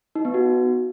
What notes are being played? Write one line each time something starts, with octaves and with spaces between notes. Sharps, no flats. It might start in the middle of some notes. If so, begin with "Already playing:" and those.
D#4
B3
F#4